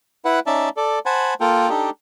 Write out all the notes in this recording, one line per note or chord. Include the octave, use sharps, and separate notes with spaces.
E4 B4 F#5
C#4 D#4 D5 E5 A5
A4 D5
C5 F#5 G#5 A5 B5
A#3 F4 A4 A#4 G5
D4 D#4 G4 A4 D#5